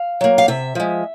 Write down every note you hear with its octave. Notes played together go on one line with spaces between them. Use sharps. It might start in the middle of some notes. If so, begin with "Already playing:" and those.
Already playing: F5
F#3 A#3
F5
C3 E5
F3 G#3